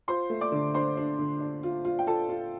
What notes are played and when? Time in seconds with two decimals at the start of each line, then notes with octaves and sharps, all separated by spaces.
0.08 F4 C5 C6
0.30 A3
0.41 D5 D6
0.52 D3
0.74 D4 C5 C6
0.97 D4
1.19 D3
1.40 D4
1.63 F4
1.85 F4
1.99 G5
2.07 F4 A4 A5
2.29 F4